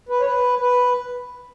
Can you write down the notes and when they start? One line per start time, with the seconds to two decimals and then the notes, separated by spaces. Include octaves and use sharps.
0.09 B4
0.20 C#5
0.25 B4
0.59 B4